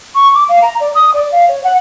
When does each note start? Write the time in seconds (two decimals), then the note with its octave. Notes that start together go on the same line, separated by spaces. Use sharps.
0.15 C#6
0.34 D6
0.49 F5
0.62 A#5
0.80 D5
0.95 D#6
1.14 D5
1.32 F5
1.48 C#5
1.64 F#5